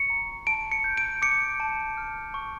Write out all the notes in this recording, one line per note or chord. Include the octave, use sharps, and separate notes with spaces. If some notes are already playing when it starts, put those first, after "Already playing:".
Already playing: C#6 C#7
A#5
A5 D7
C#7
G6
D7
D6 C#7
A5
F6
C#6